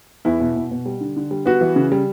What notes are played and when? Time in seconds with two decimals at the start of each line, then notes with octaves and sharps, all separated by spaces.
0.25 E2 E4
0.40 B2
0.56 B2
0.71 B2
0.86 G3
1.01 D3
1.16 D3
1.31 G3
1.46 B3 F#4
1.61 E3
1.76 C#3
1.92 G3